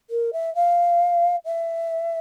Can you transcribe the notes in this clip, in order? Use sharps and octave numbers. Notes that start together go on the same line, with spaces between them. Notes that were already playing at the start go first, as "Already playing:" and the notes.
A#4
E5
F5
E5